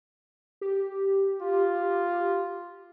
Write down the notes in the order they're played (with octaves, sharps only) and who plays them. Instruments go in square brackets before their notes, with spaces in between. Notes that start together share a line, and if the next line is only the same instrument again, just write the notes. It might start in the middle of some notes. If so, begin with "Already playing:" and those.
[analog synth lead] G4
[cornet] F4